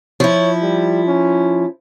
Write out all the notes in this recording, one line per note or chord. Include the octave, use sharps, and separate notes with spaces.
F3 E4 C#5
G3
C#4